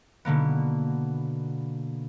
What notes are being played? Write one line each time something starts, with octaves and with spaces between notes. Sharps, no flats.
B2 D3 A#3 B3